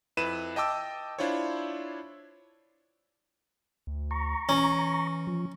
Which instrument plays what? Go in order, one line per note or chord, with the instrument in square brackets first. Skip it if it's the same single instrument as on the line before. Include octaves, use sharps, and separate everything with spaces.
[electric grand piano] F2 E4 B4 D#7 E7
D#5 G5 A5 D6 E6
D4 E4 F4 C5 C#5
[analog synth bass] D2
[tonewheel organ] A#5 C#6
[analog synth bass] E3 [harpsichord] C#4
[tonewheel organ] F3